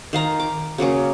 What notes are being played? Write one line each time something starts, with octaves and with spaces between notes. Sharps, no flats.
D#3 F5 A#5
D6
C#3 F#3 A#3 C#4